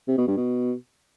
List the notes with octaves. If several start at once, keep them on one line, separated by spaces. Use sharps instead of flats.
C3
B2
G2
B2